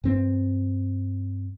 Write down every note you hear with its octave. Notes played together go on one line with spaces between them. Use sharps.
G2 C4